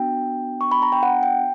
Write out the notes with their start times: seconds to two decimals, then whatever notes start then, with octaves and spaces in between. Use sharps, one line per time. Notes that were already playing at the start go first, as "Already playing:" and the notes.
Already playing: B3 D4 F#4 G5
0.61 C#6
0.71 B5
0.82 A#5
0.92 G5
1.03 F#5
1.23 G5